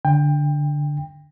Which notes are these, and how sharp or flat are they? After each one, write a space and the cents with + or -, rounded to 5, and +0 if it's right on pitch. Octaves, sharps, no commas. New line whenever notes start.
D3 +0 G5 +25